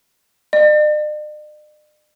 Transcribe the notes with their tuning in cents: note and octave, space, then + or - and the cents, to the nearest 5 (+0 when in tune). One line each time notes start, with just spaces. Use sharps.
D5 +45